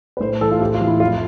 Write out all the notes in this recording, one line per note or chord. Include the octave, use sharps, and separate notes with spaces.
B4
A2 C5
E3 A4
F4
A2 G4
F4
E3
E4
F2 F4